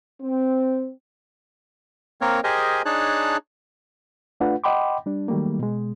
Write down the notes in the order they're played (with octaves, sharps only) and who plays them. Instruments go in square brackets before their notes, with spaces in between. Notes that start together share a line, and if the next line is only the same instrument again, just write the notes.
[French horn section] C4
[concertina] A#3 C4 A#4 C#5
G4 G#4 A#4 C5 D#5 G#5
D4 D#4 G#4 C#5 A5 F#6
[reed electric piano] A3 D4 F4 B4 F#5
D#5 F#5 G5 B5 C6 D6
G3 D4
D#3 F#3 G3 A3 A#3
B2 G#3